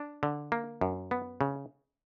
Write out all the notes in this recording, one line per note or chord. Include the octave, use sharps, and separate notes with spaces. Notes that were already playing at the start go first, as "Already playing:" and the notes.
Already playing: D4
D3
A#3
F#2
B3
C#3